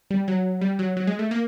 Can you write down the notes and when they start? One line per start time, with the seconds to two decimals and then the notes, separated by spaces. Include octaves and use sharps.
0.10 G3
0.28 F#3
0.61 G3
0.79 F#3
0.97 F#3
1.07 G#3
1.19 A3
1.31 A#3